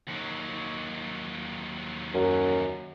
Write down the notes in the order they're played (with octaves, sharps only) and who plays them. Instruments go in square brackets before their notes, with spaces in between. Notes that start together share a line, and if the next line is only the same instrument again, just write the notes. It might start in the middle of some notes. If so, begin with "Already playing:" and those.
[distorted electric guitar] D#2 F#3
[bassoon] F#2